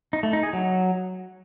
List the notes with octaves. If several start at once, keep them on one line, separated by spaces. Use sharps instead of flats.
D#4
A3
D#4
G#4
F#3